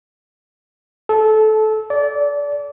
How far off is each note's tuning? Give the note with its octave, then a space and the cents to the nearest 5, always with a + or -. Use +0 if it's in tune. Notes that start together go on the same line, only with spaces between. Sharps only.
A4 -20
D5 -25